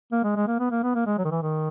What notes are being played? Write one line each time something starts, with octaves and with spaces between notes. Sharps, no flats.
A#3
G#3
G#3
A#3
B3
A#3
B3
A#3
G#3
F#3
D#3
E3
D#3